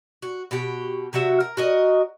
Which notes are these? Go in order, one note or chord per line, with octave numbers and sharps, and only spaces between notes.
F#4
B2 F#4 G4
C3 F#3 F#4 E5
A#4
F#4 A#4 D#5